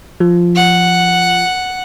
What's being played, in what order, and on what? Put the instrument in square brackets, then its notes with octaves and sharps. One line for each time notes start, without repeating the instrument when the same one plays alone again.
[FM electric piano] F3
[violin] F#5